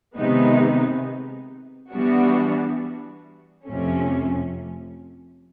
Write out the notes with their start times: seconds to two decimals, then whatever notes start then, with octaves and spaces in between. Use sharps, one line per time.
0.17 C3 D#3 G#3 B3 D#4
1.90 E3 G3 B3 D4 F#4
3.65 F2 C3 F3 A3 C#4